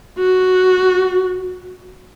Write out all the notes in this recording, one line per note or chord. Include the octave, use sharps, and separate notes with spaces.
F#4